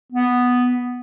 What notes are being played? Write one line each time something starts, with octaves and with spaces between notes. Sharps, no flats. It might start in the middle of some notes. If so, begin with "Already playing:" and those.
B3